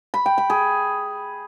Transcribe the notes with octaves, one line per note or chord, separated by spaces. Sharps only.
B5
G5
B5
G#4